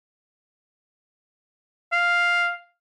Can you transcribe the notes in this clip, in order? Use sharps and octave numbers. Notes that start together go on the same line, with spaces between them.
F5